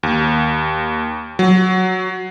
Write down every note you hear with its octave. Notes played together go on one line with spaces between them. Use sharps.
D#2
F#3